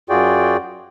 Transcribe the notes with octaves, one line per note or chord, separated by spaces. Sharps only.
F#2 F4 F#4 G#4 D5 G5